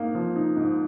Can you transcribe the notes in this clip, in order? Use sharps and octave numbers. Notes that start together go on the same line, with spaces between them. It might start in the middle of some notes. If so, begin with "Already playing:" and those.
Already playing: G#2 A#3 D#4
F3
D#4
G#2